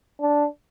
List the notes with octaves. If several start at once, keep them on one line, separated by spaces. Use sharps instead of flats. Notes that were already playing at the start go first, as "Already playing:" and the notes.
D4